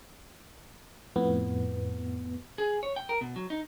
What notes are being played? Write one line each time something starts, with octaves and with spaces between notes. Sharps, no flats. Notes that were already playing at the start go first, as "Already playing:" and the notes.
F2 A2 B3
G#4
C#5
G5
A#4
B2
F#3
D#4